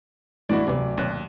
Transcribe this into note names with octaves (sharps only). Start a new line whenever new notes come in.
E2 A2 E3 G#3 D4 E4 F#4 D5
D1 C3 F#3 B3 D5
D#2 B2 F#3 C#4 F#6